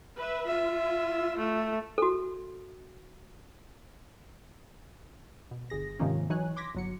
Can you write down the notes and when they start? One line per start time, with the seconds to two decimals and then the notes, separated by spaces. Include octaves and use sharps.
0.16 B4 E5
0.48 F4 E5
1.37 A3
1.98 F#4 A4
5.51 B2
5.70 G1 G#4 A#6
5.99 G#2 C3 D#3 F3 A#3 C#4
6.30 E3 F#3 D#4 C#5 G#5 F#6
6.56 C6 D6 G#6 A#6 B6
6.75 G1 F#3 C#7